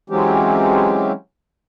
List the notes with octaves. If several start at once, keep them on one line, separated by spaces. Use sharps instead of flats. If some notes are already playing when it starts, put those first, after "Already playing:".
E3 F#3 G#3 C4 C#4 G4